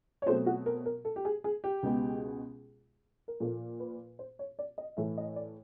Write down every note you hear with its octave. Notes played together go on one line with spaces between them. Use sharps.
C#5
B2 F#3 A3 C4 C5
F#4
A#4
A#4
A4
G4
G#4
G#4
G4
C#2 B2 G#3 B3
A#4
A#2 F3 A#3 A4
B4
C5
C#5
D5
D#5
A2 E3 A3 E5
D#5
D5